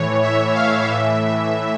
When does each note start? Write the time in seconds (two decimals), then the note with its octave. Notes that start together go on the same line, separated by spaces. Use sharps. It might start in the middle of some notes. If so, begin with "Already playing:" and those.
Already playing: A2 E3 C#5
0.23 E5
0.54 F5
0.85 A2 E3 E5